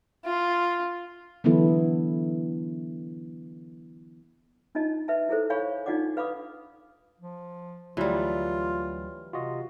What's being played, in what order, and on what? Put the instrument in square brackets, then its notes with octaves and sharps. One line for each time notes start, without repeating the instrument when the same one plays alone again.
[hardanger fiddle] F4
[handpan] D3 E3 F#3 B3 E4 A4
[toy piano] D4 D#4 F4 D#5 A5
B4 E5 A5
E4 G#4 A4 C5
C#5 F5 G#5 B5 C#6
D4 D#4 F4 D5 F#5 D6
B4 F5 B5 D6 D#6
[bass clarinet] F3
[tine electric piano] D2 F#3 [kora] E3 G3 [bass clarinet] F4
[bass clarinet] C3 [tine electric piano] F4 F#4 D#5